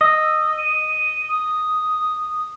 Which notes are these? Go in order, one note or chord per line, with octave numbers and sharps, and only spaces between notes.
D#5 E6
D#7
D#6